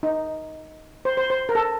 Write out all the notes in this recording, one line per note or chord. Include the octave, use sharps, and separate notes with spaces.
D#4
C5
C5
C5
A#4
A4